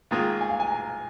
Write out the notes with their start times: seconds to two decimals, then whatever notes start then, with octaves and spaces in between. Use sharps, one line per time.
0.11 G#2 D#3 A#3 F4 G#4 F5
0.41 G#5
0.50 F5
0.60 G#5
0.70 A#5